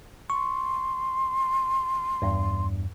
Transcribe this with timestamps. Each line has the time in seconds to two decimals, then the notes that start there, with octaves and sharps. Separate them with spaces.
0.30 C6 C#6
2.22 E2 G2